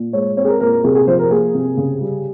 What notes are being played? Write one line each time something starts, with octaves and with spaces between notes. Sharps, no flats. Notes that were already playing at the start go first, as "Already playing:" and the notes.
Already playing: A#2
G#3 C#5
C4 C#5
G#4
A#4
A#2 A#4
A#4
C3 G#4
G#4
F3 C5
A#4
A#3 G#4
C3
C#3
G3